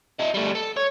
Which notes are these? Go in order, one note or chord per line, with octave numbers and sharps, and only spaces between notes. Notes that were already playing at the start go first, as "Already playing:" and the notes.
E4 D#5
G3 A3
A4
C#5